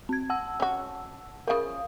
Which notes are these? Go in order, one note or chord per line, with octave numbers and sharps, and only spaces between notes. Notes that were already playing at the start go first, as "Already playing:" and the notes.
C4 G#6
F#5 A5 E6
C#4 F#4
C#3 F3 A#4 F5 D#6